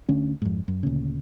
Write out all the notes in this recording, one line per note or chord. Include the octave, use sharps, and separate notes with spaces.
D2 D3 C#4
F2 G#2
F#2
D2 A#2 C#3